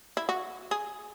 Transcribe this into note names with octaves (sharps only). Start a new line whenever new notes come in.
E4
F#4
G#4